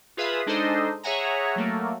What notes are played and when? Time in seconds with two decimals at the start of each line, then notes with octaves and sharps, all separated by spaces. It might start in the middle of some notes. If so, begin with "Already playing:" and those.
0.17 F4 G#4 B4 E5 F5 D#6
0.46 G#3 D4 D#4 A4 C5 D#5
1.03 G#4 C#5 E5 F#5 G#5 A#5
1.56 F#3 A3 A#3